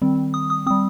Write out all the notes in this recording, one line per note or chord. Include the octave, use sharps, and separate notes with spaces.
D#3 G3 C4
D#6
D#6
G3 C4 D#6